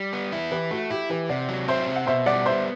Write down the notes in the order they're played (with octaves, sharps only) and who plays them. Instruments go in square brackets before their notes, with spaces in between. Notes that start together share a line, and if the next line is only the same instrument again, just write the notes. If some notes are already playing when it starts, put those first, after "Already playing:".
Already playing: [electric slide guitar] G3
B3
E4
[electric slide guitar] E3 [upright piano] G4 B4
[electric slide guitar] A3 [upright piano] F#4
[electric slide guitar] E4 [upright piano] G4
[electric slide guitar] E3 [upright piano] G4 B4
[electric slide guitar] C3 [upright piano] D5 F#5
[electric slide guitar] F#3
[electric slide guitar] C4 [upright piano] C5 E5
[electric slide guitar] C3
[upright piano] F#5
[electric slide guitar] B2 [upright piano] C5 E5
[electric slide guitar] G3 [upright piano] D5 F#5
[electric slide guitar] B3 [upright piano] C5 E5